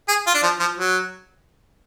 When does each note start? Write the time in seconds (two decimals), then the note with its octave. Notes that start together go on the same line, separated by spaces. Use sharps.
0.08 G#4
0.26 F4
0.34 D4
0.43 F3
0.60 F3
0.78 F#3